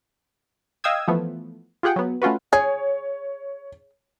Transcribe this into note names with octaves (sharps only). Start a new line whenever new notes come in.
D#5 F5 G5 D#6 E6 G#6
E3 F3 A3 B3
F4 G4 G#4 F#5 G5
F#3 B3
A3 C#4 F4 F#4 B4
G#4 C#5